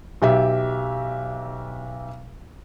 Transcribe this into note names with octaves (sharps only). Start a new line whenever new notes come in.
B1 G4 E5